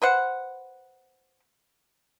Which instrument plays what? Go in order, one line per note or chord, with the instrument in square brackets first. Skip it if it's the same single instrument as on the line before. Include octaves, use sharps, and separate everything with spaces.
[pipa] B4 C5 F#5